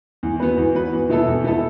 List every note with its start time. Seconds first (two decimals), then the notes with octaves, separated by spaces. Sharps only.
0.23 E2
0.40 E3 B3 F#4 B4
0.57 E2
0.74 E3 B3 F#4 B4
0.93 E2
1.09 B2 B3 E4 A4
1.27 E2
1.44 B2 B3 E4 A4